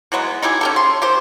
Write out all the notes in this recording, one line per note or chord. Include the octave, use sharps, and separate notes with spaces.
E3 F#3 G#3 B3
D#4 E4 G4 G#4
C#4 G4 A4
C6
D#3 G4 C5